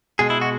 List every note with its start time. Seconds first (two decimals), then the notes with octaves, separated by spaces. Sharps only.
0.19 B2 G#3 G#4
0.30 E4
0.41 F#4